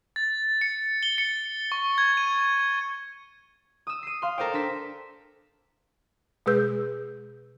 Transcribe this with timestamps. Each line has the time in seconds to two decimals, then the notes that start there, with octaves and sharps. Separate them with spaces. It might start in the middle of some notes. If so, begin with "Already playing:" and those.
0.16 A6
0.61 C#7
1.03 G7
1.18 C#7
1.72 C#6
1.98 G#6
2.17 D#7
3.87 D#6 E6
4.03 C7 D#7
4.22 F5 C6
4.38 A4 A#4 C5 D5 G5
4.53 D4 E6 B6
6.46 B2 G#3 G#4 B4 E6 G6